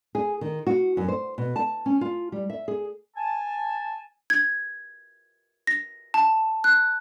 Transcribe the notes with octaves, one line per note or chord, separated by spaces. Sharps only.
G#4
D#3
F#4
F#2
C5
B2
A5
C#4
F4
G3
E5
G#4
G#5 A5
G#6
A#6
A5
F#6